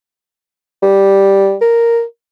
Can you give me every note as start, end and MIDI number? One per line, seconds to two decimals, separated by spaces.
0.82 1.55 55
1.61 2.03 70